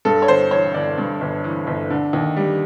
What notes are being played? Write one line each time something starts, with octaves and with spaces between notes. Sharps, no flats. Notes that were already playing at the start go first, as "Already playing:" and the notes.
G2 A4
C#5
G1 C5
E3 C#5
G1 D5
G2
G1
E3
G1
D3
D#2
G3